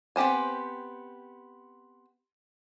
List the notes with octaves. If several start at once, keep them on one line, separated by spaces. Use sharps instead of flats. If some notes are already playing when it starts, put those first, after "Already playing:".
B3 C4 G4 C5 G#5